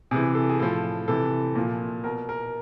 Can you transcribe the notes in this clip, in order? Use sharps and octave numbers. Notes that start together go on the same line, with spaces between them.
C3 E3 G#4
A4
G#4
A2 F3 A4
C3 E3 A4
A#2 F3
B2 A#4
A#4